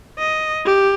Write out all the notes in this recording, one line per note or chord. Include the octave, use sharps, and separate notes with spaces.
D#5
G4